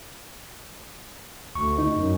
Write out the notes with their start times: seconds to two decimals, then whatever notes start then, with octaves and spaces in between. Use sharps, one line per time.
1.55 D2 C#6
1.78 D#4
1.97 F#2